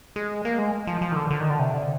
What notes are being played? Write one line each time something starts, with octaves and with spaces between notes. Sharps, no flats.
G#3
A#3
G#3
F3
F3
D#3
D3
D3
D#3
D3
C3
D3